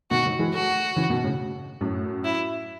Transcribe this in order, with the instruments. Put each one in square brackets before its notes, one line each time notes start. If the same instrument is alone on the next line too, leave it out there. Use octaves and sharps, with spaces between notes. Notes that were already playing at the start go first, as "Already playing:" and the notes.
[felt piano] B2 D#3 [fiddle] F#4
[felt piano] D#3 F#3
E3 G#3
[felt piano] F#3 A3 [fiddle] F#4
[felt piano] C#3 E3
B2 D#3
A2 C#3
F#2 A2
[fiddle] E4